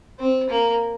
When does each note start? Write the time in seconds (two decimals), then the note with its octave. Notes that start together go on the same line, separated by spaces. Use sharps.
0.19 C4
0.50 A#3